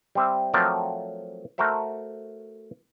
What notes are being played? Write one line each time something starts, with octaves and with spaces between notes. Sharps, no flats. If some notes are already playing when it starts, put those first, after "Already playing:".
G3 C4 E5
F3 F#3 A3 C4 A#4 D5
A3 F#4 A#4 C5 E5